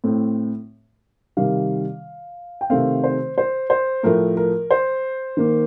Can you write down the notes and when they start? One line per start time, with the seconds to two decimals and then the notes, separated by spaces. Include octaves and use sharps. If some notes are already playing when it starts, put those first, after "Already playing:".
0.04 A2 A3 C4
1.37 C3 D#3 G3 F5
2.61 G5
2.70 C3 D#3 A3 C4 F5
3.04 C5
3.38 C5
3.70 C5
4.03 A2 F3 A3 A#4
4.37 A#4
4.71 C5
5.37 D#3 A#3